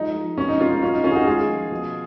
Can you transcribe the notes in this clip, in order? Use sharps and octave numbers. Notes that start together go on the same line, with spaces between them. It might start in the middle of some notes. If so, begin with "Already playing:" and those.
Already playing: F3 G#3 D#4
F3
B2 C#4
D#4
G#3 C#4 F4
D#4
F#3 C#4 F4
D#4
D#3 C#4 F4
G#4
D#4 F#4
G#3 F4 G#4
F3
B2